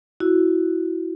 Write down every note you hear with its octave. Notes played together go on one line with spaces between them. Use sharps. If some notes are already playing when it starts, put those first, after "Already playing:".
E4 F#4